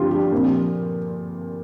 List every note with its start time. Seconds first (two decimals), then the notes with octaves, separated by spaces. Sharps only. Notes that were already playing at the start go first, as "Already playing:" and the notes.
Already playing: G2 D3 F3 A3 C4 F4 G4
0.11 G4
0.32 A#2 F3 C4